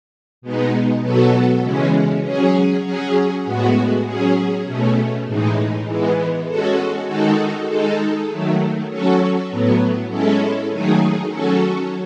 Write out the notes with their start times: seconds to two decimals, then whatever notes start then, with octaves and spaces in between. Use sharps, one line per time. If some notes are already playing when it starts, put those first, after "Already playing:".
0.42 B2 G#3 B3 D#4
1.03 B2 F#3 B3 F#4 A4
1.63 C#3 E3 G#3 C#4
2.24 F#3 C#4 G#4
2.84 F#3 C#4 G#4
3.45 A2 G#3 B3 F#4
4.05 F#3 C#4 G#4
4.65 B2 A3 C#4
5.26 A2 E3 G#3 D#4
5.86 E3 G#3 B3
6.47 G#3 C#4 F#4 A4
7.07 D#3 G#3 D#4 F#4 A4
7.69 G#3 D#4 A4
8.29 D#3 F#3 A3
8.90 F#3 C#4 F#4 A4
9.50 A2 F#3 B3
10.10 G#3 C#4 E4 A4
10.71 D#3 F#3 A3 D#4 G#4
11.31 F#3 C#4 F#4 A4